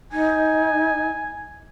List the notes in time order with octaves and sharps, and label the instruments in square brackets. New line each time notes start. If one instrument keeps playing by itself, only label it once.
[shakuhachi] D#4 [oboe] G#5